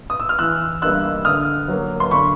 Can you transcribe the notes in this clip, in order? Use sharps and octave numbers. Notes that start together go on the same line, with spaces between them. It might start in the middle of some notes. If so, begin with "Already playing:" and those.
D#6
E6
F6
E3 E6 F#6
G3 A#3 D4 E6 F#6
D3 D#6 F6
F#3 A#3
C6
D3 B5 C#6